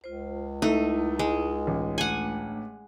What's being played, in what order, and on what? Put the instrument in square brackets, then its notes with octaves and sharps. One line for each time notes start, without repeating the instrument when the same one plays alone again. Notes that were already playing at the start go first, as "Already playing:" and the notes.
[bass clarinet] C#2 [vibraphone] F4 C5
[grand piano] A3 [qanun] D#4 [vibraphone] E4
[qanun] G#3
[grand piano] A1
[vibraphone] A3 D4 [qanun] F#5 G#5